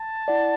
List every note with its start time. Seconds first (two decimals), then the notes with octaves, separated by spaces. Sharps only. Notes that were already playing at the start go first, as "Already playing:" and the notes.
Already playing: A5
0.28 E4 D5 F#5